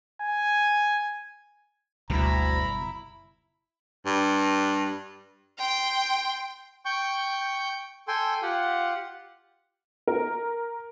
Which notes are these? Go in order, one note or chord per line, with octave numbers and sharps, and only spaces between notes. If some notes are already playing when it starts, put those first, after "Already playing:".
G#5
F#1 D2 B2 G3 E4 A#5 B5
G2
G5 C6
G5 C#6 G6
A4 G5 G#5 C6
F4 G4 F#5
A#4